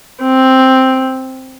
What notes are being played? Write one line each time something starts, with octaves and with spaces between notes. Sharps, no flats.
C4